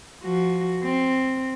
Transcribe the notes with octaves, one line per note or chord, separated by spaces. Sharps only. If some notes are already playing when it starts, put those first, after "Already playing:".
F3 F#4
C4